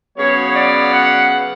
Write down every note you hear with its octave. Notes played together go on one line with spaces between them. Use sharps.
C#3 F#3 B3 C#5
D5
F#5